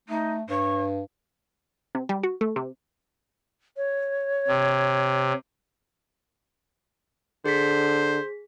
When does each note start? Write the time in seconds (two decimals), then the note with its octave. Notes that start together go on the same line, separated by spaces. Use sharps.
0.08 A3 D#4
0.49 G2 C#5
1.95 C3
2.09 G3
2.23 F#4
2.41 A3
2.56 C3
3.77 C#5
4.48 C3
7.46 D3 G#4 C5 B6